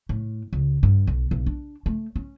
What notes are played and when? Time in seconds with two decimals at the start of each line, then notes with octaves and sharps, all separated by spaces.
0.09 A2
0.53 C#2
0.83 G2
1.07 B1
1.31 B1
1.46 D4
1.86 A3
2.16 C#4